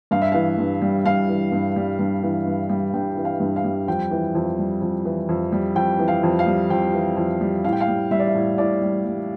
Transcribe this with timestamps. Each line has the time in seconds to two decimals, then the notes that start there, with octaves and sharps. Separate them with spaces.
0.11 G2 F5
0.22 E5
0.32 E3 F5
0.58 G2
0.82 G3
1.05 G2 F5
1.29 E3
1.52 G2
1.76 G3
1.99 G2
2.23 E3
2.46 G2
2.69 G3
2.94 G2 G5
3.17 E3
3.25 F5
3.40 G2
3.56 F5
3.64 G3
3.87 F2 G5
4.11 E3
4.35 F2
4.58 G3
4.82 F2
5.05 E3
5.29 F2
5.52 G3
5.76 F2 G5
5.99 E3
6.08 F5
6.23 F2
6.39 F5
6.47 G3
6.70 F2 G5
6.94 E3
7.17 F2
7.41 G3
7.65 A2 F5
7.73 G5
7.81 F5
7.88 G3
8.11 G3 E5
8.20 D5
8.28 E5
8.35 A2
8.58 A2 D5
8.82 G3
9.06 G3